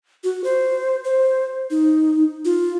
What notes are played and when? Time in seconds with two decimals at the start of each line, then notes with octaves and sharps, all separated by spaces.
0.24 F#4
0.44 C5
1.04 C5
1.70 D#4
2.45 F4